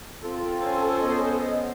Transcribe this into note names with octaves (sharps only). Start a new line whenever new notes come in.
C4 F4 A4
C#4 C5
B3 D#5